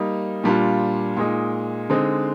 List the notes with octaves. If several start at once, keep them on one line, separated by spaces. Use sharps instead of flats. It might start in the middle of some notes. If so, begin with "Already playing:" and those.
Already playing: G3 A#3 D#4
A#2 G3 D4 F4
A#2 G#3 D#4
D3 G#3 C4 D#4